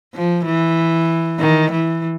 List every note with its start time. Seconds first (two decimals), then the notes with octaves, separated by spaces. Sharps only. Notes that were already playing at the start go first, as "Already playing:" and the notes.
0.14 F3
0.46 E3
1.39 D#3
1.72 E3